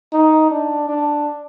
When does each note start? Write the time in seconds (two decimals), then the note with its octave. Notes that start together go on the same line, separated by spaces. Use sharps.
0.13 D#4
0.51 D4
0.89 D4